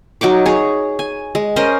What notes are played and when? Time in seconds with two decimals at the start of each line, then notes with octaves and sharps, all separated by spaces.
0.21 F#3 D#4 C#6 D6
0.46 G#4 C#5
0.99 G#5
1.35 G#3
1.56 C#4 A#4 C5 D#5